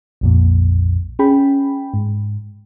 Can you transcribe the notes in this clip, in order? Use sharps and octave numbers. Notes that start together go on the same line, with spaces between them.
A#1 F2 A#2
C#4 G#4 G5 B5
G#2